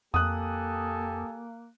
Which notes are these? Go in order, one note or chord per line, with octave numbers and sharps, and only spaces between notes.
F2 A#3 G4 A4 G#5 D#6 F#6